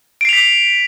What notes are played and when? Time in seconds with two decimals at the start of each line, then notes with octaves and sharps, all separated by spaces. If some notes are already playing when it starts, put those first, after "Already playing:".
0.21 D7
0.25 C7
0.29 F7
0.33 B6